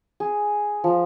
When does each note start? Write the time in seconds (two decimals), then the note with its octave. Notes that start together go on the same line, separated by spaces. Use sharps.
0.20 G#4
0.84 F3